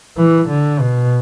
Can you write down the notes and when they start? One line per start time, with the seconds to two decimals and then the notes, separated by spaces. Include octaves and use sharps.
0.17 E3
0.49 D3
0.80 B2